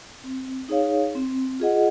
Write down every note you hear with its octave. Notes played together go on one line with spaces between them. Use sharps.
C4
D#4 G#4 C#5 F5
C4
F4 G#4 D#5 F#5